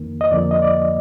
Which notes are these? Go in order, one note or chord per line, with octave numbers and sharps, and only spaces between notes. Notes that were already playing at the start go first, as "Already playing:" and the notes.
Already playing: F2 D#3 A#3
D#5
F2 D3 F3 A#3 D5
D#5
D5